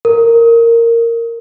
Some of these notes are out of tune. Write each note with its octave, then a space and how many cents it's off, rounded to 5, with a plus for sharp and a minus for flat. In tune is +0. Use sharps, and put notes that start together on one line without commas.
A#4 -10